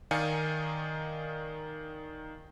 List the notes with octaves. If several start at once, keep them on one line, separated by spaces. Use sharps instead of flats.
D#3 D#4 D5 F5 G#5 C#7